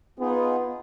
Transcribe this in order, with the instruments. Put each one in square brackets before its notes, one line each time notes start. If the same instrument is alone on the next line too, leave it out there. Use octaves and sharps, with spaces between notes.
[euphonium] B3 [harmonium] D#4 F4 G#4